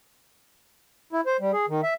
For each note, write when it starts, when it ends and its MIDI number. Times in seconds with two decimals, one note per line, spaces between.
1.13 1.21 64
1.26 1.37 72
1.40 1.51 55
1.53 1.66 68
1.68 1.81 51
1.83 1.94 76